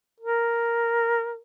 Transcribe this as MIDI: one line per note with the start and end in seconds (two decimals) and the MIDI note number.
0.20 1.40 70